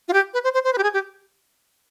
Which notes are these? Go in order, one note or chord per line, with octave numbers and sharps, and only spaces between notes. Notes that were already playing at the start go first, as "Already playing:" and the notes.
F4
G4
B4
C5
C5
C5
B4
G4
G#4
G4